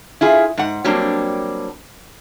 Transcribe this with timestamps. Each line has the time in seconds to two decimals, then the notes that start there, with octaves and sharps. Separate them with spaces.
0.21 E4 F4 G#4
0.58 G#2 F#5
0.84 F#3 G3 A#3 C4 D4